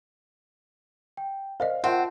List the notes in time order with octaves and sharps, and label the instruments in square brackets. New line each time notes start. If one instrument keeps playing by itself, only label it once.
[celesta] G5
[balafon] A#4 D5 D#5 [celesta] C5 [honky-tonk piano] F5
[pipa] C4 [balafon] F4 A#4 E5 [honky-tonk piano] F#5 [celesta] A5